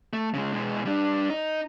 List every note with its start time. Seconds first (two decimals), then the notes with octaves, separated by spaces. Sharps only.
0.13 A3
0.34 C#3 G#3
0.53 B2 G#3
0.85 G3 D4
1.30 D#4